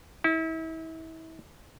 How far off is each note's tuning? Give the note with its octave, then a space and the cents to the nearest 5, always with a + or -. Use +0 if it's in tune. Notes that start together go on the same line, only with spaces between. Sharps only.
E4 -35